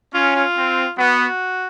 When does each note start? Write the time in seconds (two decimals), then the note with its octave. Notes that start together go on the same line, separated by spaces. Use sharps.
0.14 C#4 F4
0.36 F4
0.57 C4
0.98 B3 F#4